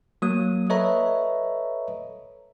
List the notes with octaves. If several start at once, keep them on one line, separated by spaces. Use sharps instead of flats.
F#3 A#3 D#6
A4 B4 C#5 D#5 E5 A#5